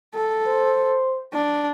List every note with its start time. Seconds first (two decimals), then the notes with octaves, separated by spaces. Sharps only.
0.15 A4
0.47 C5
1.33 D4